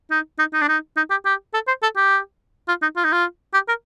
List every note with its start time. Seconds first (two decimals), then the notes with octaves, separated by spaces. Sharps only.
0.11 D#4
0.39 D#4
0.53 D#4
0.61 D4
0.69 D#4
0.97 D#4
1.10 G4
1.25 G4
1.54 A4
1.67 C5
1.83 A4
1.97 G4
2.68 F4
2.82 D#4
2.96 F4
3.04 D#4
3.12 F4
3.54 G4
3.68 A#4